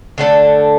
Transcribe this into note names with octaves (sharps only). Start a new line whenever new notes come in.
D3 A3 D4 A4